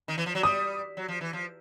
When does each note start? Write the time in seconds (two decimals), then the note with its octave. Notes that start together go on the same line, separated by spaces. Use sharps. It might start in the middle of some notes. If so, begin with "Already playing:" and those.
0.08 D#3
0.18 E3
0.26 F3
0.35 F#3
0.43 G3 D#6
0.97 F#3
1.08 F3
1.21 E3
1.33 F3